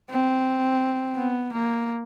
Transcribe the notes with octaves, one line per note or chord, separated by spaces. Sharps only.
C4
B3
A#3